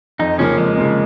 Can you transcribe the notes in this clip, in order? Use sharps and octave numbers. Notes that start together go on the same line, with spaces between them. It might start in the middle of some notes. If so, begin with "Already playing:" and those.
F2 D#4
C#3 F3 A#3 C#4
F2 G#3
C#3 F3 A#3